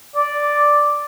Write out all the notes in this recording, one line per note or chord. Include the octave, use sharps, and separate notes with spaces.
D5